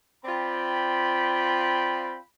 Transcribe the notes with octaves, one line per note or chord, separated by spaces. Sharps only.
C4 F4 D5 G5 B5